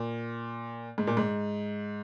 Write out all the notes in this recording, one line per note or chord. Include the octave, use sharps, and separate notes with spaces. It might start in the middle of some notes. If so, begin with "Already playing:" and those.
Already playing: A#2
G#2
A#2
G#2